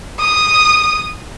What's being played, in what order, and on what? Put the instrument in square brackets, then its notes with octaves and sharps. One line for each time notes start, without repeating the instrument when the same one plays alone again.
[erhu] D#6